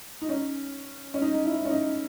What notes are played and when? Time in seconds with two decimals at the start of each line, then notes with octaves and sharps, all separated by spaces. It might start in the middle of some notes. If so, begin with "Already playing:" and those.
0.22 D#4
0.29 C#4
1.14 C#4
1.22 D#4
1.34 D#4
1.46 E4
1.65 C#4
1.69 D#4